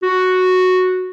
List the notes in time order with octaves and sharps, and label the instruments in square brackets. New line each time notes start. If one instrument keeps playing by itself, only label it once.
[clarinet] F#4